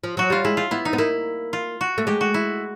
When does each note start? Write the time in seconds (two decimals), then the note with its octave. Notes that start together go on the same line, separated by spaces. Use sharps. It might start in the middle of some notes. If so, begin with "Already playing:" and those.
0.04 F3
0.17 F#3 F#4
0.30 G3 F4
0.45 G#3 E4
0.57 F4
0.71 B3 E4
0.85 D#4
0.93 B3
0.98 A#3 E4
1.53 F4
1.81 F#4
1.98 A3
2.07 G#3 G4
2.21 F#4
2.34 E4